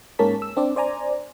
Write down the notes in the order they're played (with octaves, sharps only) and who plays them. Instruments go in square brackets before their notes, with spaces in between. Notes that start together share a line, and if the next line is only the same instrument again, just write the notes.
[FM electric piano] G#2 A#3 C#4 A5 B6
E6
C4 D4 D5
C5 D5 G#5 A#5